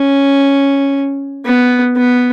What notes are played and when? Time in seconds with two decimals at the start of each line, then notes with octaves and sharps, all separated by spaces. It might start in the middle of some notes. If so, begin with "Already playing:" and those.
Already playing: C#4
1.45 B3
1.96 B3